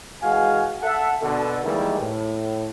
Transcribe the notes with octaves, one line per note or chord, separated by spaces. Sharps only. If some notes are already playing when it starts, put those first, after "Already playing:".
E3 G#3 F#4 F5 G#5
A4 E5 F#5
B2 D3 A4
D#3 E3 G3 G#3 A#3 E4
A2